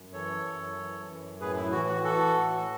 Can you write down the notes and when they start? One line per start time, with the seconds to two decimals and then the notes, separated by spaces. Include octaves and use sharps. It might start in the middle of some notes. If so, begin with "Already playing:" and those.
Already playing: F#2
0.13 E3 A4 C#5
0.45 F#2
0.77 E3
1.09 F#2
1.40 A2 G#4 B4
1.57 E4
1.71 E3 F#4
1.88 F#4
2.04 E3 F#4 A4
2.35 A2